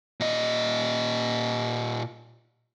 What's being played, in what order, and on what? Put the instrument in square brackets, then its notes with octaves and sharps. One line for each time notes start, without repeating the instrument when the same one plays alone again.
[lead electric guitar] A#2 D#5